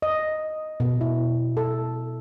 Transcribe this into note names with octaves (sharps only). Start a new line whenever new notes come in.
D#5
B2
E4
A4